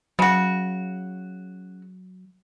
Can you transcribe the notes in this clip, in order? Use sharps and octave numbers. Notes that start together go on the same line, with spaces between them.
C#3 F#3 F#4